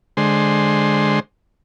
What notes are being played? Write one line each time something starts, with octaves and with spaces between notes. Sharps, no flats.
D3 G#3 C5